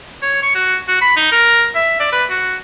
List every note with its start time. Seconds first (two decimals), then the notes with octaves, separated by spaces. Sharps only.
0.22 C#5
0.43 C#6
0.55 F#4
0.88 F#4
1.02 B5
1.17 D#4
1.32 A#4
1.75 E5
2.00 D5
2.12 B4
2.30 F#4